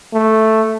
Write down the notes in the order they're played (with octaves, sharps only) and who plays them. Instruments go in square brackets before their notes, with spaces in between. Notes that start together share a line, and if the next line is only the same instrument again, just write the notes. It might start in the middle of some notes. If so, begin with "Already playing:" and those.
[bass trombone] A3